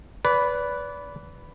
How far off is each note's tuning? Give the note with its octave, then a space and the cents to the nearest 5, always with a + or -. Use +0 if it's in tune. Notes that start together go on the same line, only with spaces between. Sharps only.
B4 +0 D5 -30